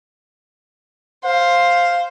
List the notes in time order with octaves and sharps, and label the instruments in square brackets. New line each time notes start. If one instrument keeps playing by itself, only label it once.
[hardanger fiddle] C5 [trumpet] F5